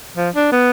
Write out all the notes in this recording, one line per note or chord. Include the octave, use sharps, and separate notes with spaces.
F3
D4
B3